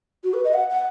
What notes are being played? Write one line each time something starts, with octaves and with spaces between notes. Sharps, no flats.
F#4
B4
D#5
F#5
F#5